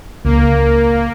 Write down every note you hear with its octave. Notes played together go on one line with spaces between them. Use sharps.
C#2 A#3